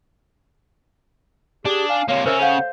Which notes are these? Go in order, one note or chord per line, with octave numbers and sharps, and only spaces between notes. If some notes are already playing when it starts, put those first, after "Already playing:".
D4 G4 G#4 A5
F5 G#5
C3 A#3 C#5 F5
C#3 C#4 A#4 C5 C#5 E5 E6
A4 C5 F5 F#5